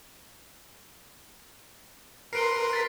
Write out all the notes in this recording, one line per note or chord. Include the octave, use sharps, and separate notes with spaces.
A#4 B4 C6 C7 D7
A6 B6